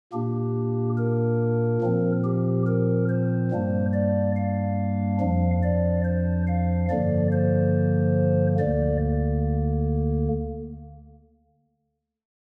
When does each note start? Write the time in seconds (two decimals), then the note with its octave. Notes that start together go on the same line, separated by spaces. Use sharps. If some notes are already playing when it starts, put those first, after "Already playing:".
0.13 A#2 A#3 D4 G4
0.97 A#4
1.82 A#2 F3 C4
2.24 G4
2.66 A#4
3.09 C5
3.51 G2 G3 A#3 D4
3.93 D5
4.36 F5
5.21 F2 F3 D4
5.63 D5
6.05 C5
6.47 F5
6.89 G2 D3 F3 A#3 D5
7.32 C5
8.59 D2 D3 A#3 D5